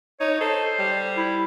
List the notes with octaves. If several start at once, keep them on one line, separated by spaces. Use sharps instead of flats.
D#4 C#5
A4 C5
G3
E4